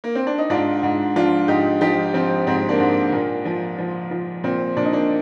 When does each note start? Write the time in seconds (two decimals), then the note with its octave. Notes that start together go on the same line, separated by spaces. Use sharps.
0.04 A#3
0.15 C4
0.27 D4
0.38 D#4
0.50 G#2 D4 F4
0.83 G#2
1.16 F3 D4 F4
1.48 G#2 D#4 G4
1.81 F3 D#4 G4
2.14 F3 C4
2.47 G#2 C4
2.69 A#3 D4
2.80 G#2
3.12 A#2 A#3
3.45 F3
3.79 F3
4.11 F3
4.44 A#2 C4
4.77 A#2 D4
4.85 D#4
4.93 A#3 D4